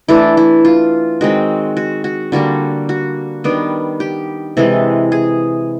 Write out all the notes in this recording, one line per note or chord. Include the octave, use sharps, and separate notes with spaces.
E3 A3 D4 E4
E4
F4
D#3 G#3 C4 F#4
F#4
F#4
D3 G3 A#3 F#4
F#4
D#3 G3 B3 D4
G4
C3 E3 G#3 A4
G#4